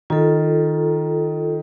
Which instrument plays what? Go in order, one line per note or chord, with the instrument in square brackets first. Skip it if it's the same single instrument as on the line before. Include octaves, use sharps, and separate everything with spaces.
[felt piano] D#3 [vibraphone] F4 A4